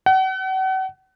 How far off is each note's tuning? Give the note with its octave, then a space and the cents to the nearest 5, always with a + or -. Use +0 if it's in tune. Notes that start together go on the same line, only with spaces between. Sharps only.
F#5 +40